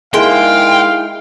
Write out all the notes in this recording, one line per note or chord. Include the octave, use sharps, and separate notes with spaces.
G#3 A#3 D#4 E4 G#4 F5 G5